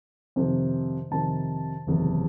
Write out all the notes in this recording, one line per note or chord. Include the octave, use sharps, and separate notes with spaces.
F2 C3 D#3
F2 C3 D#3 A5
F#1 E2 C3 D#3